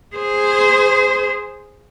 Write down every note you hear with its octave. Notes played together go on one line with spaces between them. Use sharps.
G#4 C5